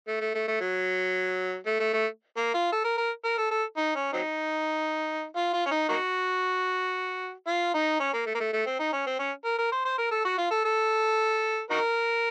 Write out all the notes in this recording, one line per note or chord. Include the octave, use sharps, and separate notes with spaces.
A3
A3
A3
A3
F#3
A3
A3
A3
A#3
F4
A4
A#4
A#4
A#4
A4
A4
D#4
C#4
F#3 C4 D#4
F4
F4
C#4
D#4
A#3 D#4 F#4
F4
D#4
C#4
A#3
A3
A#3
A3
A3
C4
D#4
C#4
C4
C#4
A#4
A#4
C5
C5
A#4
A4
F#4
F4
A4
A4
D#4 F#4 A#4